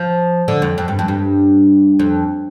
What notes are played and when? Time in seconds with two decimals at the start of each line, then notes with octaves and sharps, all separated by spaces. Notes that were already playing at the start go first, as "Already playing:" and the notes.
Already playing: F3
0.48 D3
0.62 F2
0.78 F2
0.88 G2
0.99 F2
1.08 G2
1.99 F2